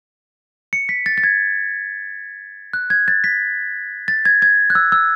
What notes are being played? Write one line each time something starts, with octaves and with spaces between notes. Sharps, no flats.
C#7
B6
A6
A6
G#6
F#6
G#6
A6
B6
A6
G#6
G#6
F#6
E6
E6